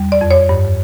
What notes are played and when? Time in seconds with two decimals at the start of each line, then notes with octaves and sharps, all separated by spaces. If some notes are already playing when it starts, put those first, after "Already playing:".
Already playing: E2 G3
0.12 D5
0.21 F2
0.31 C#5
0.49 G2